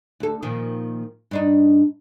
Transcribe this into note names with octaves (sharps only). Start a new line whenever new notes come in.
D2 A4
A#2 D#3 F3
G2 D4 D#4